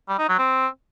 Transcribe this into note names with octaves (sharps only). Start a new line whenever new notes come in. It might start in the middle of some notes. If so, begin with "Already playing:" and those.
G3
D#4
F#3
C4